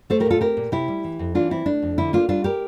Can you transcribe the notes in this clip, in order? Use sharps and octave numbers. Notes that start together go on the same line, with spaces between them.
A3 A4 C5
G4 A#4
A#2 F4 A4
C4 G4 A#4
A#2
C3 E4 G4
G3
E3
F2
E3 D4 F4
C4 E4
A3 D4
F2
D3 E4
A#3 D4 F4
G3 D4 F4
G4 A#4